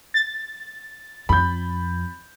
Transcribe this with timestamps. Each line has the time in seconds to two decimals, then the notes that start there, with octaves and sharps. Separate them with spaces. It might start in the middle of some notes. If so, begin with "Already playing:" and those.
0.14 A6
1.29 F2 B5 G6